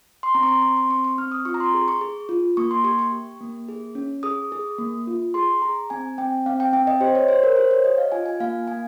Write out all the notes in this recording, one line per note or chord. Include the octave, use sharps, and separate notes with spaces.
C6
C4 A#5
C#6
C6
C4 C#6
C6
C4 C#6
C#6
C4 F6
D#6
F4 C#6
A#5
C6
G#4
C#6
G#4
F4
A#3 C#6
C6
G4 C#6
C#6
G4
A#3
G#4
C#4
G#4 D#6
G#4
A#3
F4
G#4 C6
G#4 A#5
C4 G#5
C4 G5
C4 F5
G5
C4 G5
D#5
G4 C5
C#5
G4 C5
A#4
G4 C5
C#5
G4 D#5
F5
F4 G#5
G#5
A#3 F5
A#3 G#5